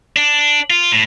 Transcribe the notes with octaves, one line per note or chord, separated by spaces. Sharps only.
D4
F4
A2